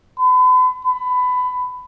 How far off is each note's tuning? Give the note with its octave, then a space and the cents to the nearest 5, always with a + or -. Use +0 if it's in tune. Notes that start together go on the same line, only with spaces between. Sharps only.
B5 +40
B5 +20